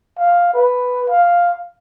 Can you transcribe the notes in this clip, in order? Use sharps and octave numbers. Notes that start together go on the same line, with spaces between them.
F5
B4
F5